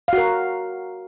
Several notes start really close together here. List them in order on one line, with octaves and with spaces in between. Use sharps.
F5 F#4 A#4